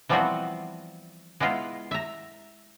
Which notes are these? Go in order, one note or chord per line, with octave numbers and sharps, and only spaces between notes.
E3 F3 G3 B3 C4 F#4
G#3 B3 E4 F4
E5 A#5